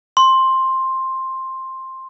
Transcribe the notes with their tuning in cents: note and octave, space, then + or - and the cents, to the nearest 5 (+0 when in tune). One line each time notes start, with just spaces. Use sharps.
C6 +10